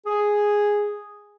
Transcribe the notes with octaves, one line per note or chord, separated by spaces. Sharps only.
G#4